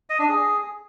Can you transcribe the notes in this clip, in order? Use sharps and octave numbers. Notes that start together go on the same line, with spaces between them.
D#5
D4
G#4